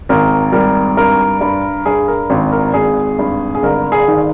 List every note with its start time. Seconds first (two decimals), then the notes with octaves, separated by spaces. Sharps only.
0.09 G#1 A#4
0.52 G3 A#4
0.97 G2 A#4
1.41 G2
1.86 G2 G#4
2.08 A#4
2.30 G#1
2.52 A#4
2.74 G#1 G#4
3.19 G2
3.55 G#4
3.63 G1 A#4
3.92 G#4
4.08 D#3